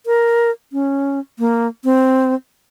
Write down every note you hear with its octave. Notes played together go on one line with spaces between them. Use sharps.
A#4
C#4
A#3
C4